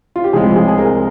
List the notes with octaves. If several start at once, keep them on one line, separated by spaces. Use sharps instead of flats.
F4
G4
C2 C3 F3 G#3 G#4
G#4
G#4
A#4